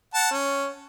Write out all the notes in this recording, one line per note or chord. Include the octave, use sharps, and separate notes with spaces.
F#5 A5
C#4